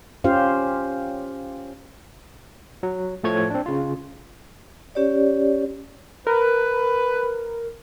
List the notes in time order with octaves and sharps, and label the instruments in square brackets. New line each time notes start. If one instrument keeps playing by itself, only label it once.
[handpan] C#4 F4 G4 C5 F5
[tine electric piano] F#3
A2 F3 A3 C#5 G#6
C4 D4
C#3 F4
[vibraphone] C#4 G4 C#5 D5
[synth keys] A#4 [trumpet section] B4